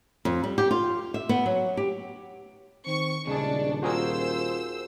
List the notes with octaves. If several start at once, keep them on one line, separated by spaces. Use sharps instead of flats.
F2
G3
G4
F4
E5
B3
F#3
G4
D#3 C4 C#6
D#1 C#3 G#3 D4 G#4
F4 F#4 G#4 A#4 C5 E6